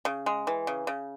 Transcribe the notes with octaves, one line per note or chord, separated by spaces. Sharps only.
C#3
G#3
E3
C#3
C#3